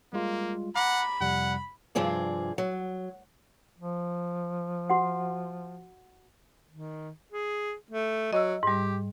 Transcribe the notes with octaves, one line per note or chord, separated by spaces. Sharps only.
G3 G#3 A#3 F4
F#5 A#5 B5 D6 A#6
F2 C3 G3 F#5
G2 C3 F3 C4 G#4 D5
F#3
F3
F#4 F#5
D#3
G#4
A3
F#3 D#5 E6
G#2 G3 G4